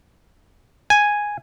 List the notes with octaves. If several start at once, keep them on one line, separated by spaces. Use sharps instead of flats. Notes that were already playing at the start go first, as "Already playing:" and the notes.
G#5